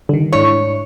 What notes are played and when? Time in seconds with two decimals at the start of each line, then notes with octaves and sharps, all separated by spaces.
0.09 D3 D#3 G3
0.33 G#2 D4 E4 C#5